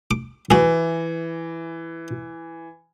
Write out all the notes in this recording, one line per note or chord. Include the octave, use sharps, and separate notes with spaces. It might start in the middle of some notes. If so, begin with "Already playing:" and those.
D6
E3 F#4 G#4